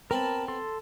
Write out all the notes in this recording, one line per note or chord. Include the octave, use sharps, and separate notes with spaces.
B3 C4 A#4 A5 B5
A4 C6